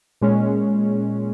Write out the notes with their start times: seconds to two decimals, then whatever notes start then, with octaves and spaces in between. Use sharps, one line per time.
0.21 A#2 G#3 C#4